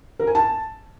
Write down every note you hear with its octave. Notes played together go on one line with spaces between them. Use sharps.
A#4
G#5
A5